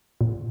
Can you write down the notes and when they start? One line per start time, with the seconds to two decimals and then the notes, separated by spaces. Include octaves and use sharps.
0.21 A#2